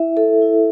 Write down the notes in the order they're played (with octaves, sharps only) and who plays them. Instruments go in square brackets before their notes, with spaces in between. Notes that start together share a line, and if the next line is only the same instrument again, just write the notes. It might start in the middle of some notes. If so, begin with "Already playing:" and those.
Already playing: [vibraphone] E4 E5
A4
E4